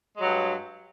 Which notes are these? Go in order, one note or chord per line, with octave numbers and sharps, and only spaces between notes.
G2 F#3 G#3